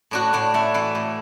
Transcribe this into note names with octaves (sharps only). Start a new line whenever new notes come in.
A2 D4 F#4
A2 D4 F#4
A3 E4
E3 E4
A2